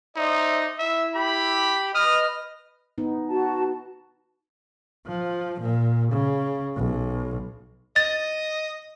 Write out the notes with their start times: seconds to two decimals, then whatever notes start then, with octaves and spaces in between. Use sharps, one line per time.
0.16 D#4 C5 D5 E5
0.79 E4 E5
1.16 G4 B5
1.95 B4 D#5 D#6 F6
2.98 B3 D#4
3.28 F#4 A5
5.07 F3
5.61 A#2
6.12 C#3
6.76 B1
7.96 D#5 A6